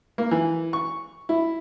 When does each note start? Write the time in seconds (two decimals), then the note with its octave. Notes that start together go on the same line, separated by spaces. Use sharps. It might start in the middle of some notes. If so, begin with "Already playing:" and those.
0.18 A#3
0.31 E3
0.73 C#6
1.29 E4